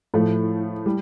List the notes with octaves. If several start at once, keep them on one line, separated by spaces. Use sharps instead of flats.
A2 F3 A3
G3